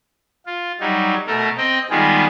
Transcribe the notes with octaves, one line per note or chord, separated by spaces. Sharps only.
F4
F#3 G3 D#4
B2 A3 A4 A#4
C4 D#5 G5
D#3 G3 G#3 B3 F4 G#4